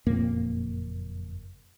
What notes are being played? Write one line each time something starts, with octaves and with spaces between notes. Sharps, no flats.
F#1 F2 A#2 A#3